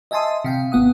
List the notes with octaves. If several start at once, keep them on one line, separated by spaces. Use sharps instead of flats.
D#5 E5 G#5 A5 C6 D#6
C3 F5 G5
G#1 B3 F#5 D#6